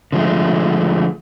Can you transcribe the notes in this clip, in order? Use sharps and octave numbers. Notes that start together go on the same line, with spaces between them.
D3 F3 G#3 A3